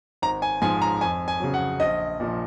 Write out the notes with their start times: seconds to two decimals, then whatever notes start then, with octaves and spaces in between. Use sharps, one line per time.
0.22 G#1 A#5
0.42 G#5
0.62 G#2 F3 G#5
0.82 A#5
1.01 F2 G#5
1.28 G#5
1.40 C#3 F#3
1.54 F#5
1.80 A#1 D#5
2.20 A#2 F3